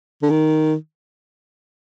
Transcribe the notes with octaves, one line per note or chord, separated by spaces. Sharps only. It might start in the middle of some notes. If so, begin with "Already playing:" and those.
D3
D#3